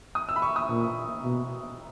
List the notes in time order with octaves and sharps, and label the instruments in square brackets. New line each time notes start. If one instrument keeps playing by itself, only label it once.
[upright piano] D#6
E6
B5
C#6
D#6
[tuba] A#2
B2